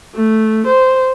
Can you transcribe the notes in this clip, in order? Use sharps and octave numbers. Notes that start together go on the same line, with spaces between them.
A3
C5